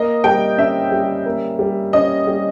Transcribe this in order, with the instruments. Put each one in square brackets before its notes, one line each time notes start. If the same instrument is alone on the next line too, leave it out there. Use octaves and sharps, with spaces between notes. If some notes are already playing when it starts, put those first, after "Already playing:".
Already playing: [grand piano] A#3 [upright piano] D#5
[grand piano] G3 [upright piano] G5
[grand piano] C#4 [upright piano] E5
[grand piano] G3
A#3
G3
[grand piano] C#4 [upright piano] D#5
[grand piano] G3